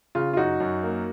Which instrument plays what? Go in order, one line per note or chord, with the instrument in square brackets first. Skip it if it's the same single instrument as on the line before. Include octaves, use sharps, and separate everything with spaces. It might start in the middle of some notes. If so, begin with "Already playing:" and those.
[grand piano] C#3 F4
F4
F#2 D#4 F#4
F#2
A#3